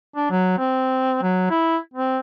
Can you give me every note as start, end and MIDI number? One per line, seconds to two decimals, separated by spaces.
0.16 0.27 62
0.30 0.54 54
0.58 1.18 60
1.22 1.45 54
1.50 1.77 64
1.94 2.20 60